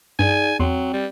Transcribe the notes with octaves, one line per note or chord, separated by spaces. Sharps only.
G2 D#4 G#4 D5 G#5
E2 F#3 C4 G5 C6
G3